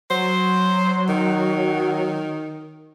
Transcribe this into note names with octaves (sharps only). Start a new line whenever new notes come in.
F#3 C5
D#3